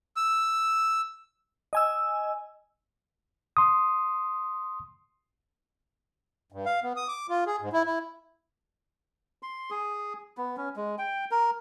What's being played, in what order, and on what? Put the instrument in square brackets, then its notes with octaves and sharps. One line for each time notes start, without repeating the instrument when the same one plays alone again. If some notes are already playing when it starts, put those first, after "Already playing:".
[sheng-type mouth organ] E6
[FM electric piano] D#5 G#5 E6
[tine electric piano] C6 D#6
[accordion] G2
F5
B3
D#6
D6
F4
G#4
G#2
E4
E4
[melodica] C6
G#4
B3
C#4
G#3
G5
A#4